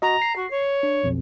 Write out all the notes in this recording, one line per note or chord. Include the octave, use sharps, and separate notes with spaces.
F#4 D#5 A#5
C7
F#4
C#5
D4
B1 F2 B2